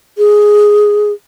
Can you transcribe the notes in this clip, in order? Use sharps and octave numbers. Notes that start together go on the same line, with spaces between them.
G#4